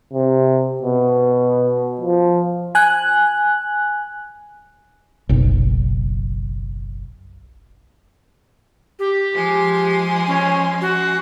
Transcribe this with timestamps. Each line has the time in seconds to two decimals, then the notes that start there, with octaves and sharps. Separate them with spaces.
0.14 C3
0.83 B2
2.01 F3
2.75 G#5 F#6
5.29 F#1 B1
8.99 G4
9.32 F3 G#3 C6
10.27 C#4
10.81 F#4